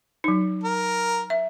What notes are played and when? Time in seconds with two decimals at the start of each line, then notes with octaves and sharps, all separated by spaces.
0.24 F#3 D#4
0.63 A#4
1.30 E5